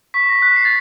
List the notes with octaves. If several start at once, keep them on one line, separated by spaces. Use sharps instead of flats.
C#6 B6
A#6
F#6 B6
C7
A6